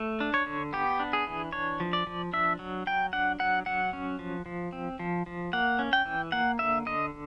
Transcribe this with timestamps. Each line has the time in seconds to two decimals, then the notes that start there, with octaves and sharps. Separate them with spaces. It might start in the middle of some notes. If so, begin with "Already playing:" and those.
Already playing: A3
0.20 D4
0.34 C#5
0.46 D3
0.73 B3 G4
1.00 D4
1.13 G#4
1.27 E3
1.53 D4 C#5
1.80 F3
1.93 D5
2.07 F3
2.33 D4 E5
2.59 F#3
2.87 F#3 G5
3.13 D4 F#5
3.39 F#3 F#5
3.66 F#3 F#5
3.93 C#4
4.19 F3
4.46 F3
4.73 C4
4.99 F3
5.26 F3
5.53 A#3 F#5
5.79 C#4
5.93 G5
6.06 E3
6.32 A#3 F#5
6.59 D3 E5
6.86 D3 D#5